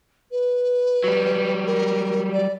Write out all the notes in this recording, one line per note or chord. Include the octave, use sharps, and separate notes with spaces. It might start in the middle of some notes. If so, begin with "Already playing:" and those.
B4
F#3 G3
A#4
D5